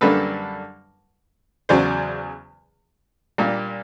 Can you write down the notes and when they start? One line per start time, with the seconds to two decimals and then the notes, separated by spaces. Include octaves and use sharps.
0.01 F#2 D3 G3 A#3 D4 A4 B4
1.69 E2 C#3 F#3 C5 D5
3.38 A#2 G3 A#3 D4